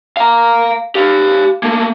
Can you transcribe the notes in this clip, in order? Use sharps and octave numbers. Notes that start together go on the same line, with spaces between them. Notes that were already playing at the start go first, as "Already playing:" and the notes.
F5 A#5
G4 F5
A3 A#3